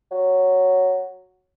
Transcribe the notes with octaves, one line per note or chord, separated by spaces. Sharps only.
F#3